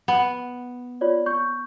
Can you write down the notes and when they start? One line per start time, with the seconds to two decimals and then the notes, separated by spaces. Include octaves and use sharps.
0.08 B3
1.01 F4 C#5 D5
1.26 C#6 G6